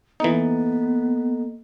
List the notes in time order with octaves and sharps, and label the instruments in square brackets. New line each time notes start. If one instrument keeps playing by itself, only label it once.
[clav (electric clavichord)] E3 D#4 [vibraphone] A#3 A4 D#5 [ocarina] B3